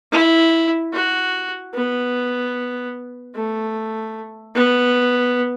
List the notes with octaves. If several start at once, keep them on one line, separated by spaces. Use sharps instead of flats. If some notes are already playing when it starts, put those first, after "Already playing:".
E4
F#4
B3
A3
B3